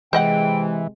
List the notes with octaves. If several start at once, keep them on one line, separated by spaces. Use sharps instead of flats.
C3 E3 G#3 C5 D#5 F#5 G5